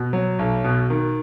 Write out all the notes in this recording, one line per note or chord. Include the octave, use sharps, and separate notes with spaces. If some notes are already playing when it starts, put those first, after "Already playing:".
Already playing: B2
F#3
B1
B2
D#3